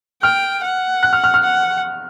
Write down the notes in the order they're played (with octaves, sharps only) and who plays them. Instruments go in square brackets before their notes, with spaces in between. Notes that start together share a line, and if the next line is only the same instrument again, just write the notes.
[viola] G5 [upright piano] F6
[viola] F#5
[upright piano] F#6
F6
F6
F6
[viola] F#5